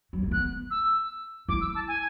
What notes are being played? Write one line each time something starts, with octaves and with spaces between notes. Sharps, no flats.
F#3
G#3
B3 F#6
E6
E4 D6
E6
A5
G#5